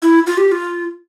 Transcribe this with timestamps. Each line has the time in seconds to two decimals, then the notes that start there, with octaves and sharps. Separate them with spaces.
0.03 E4
0.27 F4
0.38 G4
0.48 G4
0.52 F4